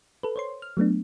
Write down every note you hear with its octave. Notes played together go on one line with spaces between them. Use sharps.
A4 B4
C5 C#5 C6
F6
F#3 A3 B3 D4